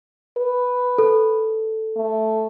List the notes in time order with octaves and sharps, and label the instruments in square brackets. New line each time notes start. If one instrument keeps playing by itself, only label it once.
[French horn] B4
[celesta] A4
[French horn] A3